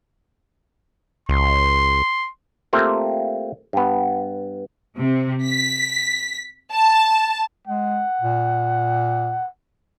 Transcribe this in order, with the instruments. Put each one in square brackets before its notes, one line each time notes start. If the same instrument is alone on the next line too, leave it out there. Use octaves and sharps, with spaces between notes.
[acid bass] C#2 [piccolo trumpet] C6
[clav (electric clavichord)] A3 A#3 C4 F4 G4
G2 B3
[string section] C3
B6
A5
[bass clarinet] G#3 [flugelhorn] F#5
[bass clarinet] A#2